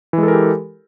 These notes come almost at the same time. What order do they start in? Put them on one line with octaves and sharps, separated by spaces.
E3 G#3 A4 A#4 G4